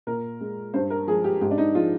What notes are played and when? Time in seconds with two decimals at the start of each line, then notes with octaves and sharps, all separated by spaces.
0.07 A#2 A#4
0.40 G#3
0.74 G2 C5
0.90 A#4
1.07 F3 G#3 G#4
1.24 G4
1.41 G#2 G4
1.51 D4
1.58 D#4
1.75 F3 G#3 F4